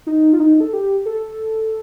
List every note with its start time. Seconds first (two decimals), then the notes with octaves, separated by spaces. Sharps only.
0.07 D#4
0.33 F4
0.40 D#4
0.60 A4
0.73 G4
1.06 A4